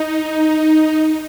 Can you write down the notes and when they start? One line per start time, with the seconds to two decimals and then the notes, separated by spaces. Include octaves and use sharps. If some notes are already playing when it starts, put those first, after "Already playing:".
Already playing: D#4
0.87 D#4